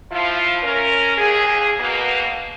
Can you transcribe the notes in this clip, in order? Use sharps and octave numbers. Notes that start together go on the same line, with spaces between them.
F3 E4 F4
C#4 A#4
D#2 G#4
B2 A#3